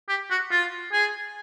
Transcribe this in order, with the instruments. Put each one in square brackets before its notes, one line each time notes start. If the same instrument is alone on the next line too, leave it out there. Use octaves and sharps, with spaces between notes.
[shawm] G4
F#4
F4
G#4